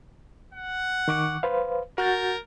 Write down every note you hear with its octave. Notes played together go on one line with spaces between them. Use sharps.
F#5
D#3 C#6 D6
B4 C5 F5
F#4 A#4 G6 A6